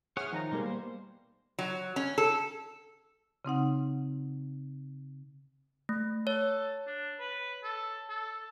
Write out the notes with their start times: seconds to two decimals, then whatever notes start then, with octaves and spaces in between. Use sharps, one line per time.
0.17 G#4 C#5 E5 F#5 D#6 F6
0.32 D#3 F3 D#4 A#5
0.52 B2 G3 G#3 A#3
0.66 C5
1.59 F#3
1.96 C#4
2.18 A4
3.45 C#3 C4 D#4 F#5
5.89 A3
6.27 A4 C#5
6.87 D4
7.20 B4
7.64 A4
8.09 A4